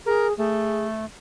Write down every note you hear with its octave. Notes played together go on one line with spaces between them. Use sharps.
G#4 A#4
A3 G#4